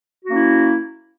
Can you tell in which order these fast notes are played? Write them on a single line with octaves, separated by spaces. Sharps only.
F#4 A#3 C#4 E4